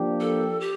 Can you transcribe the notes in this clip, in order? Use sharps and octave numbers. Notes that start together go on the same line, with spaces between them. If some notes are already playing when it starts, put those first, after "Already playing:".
Already playing: F3 A#3 D4 G4
A4
G4